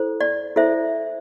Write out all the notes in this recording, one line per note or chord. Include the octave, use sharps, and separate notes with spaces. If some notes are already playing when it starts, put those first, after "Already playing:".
Already playing: E4 A4 C5
D5
E4 A4 C5 E5